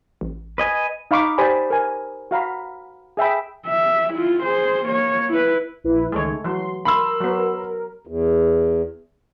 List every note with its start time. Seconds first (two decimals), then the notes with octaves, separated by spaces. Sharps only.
0.21 A1
0.58 B4 D#5 G#5
1.11 D#4 F5 B5 C#6 D6
1.38 G4 C5 D5 G#5 B5
1.70 A#4 G#5
2.31 F#4 F5 A#5 B5
3.17 G#4 E5 G5 B5
3.67 E5
4.13 E4 F4
4.43 G#4 C5
4.85 A#3 C#5
5.30 E4 B4
5.84 A#1 E4 B4
6.12 C#2 D#3 G#3 A3 C#5
6.44 E3 F#3 C6
6.85 A#4 B5 C6 E6
7.21 F#3 B3
8.07 E2